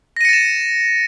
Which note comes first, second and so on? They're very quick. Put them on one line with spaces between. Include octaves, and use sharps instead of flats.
A#6 D#7 C#7 A6 E7